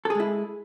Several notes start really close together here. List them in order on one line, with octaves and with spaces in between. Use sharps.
A4 G#4 G#3 E4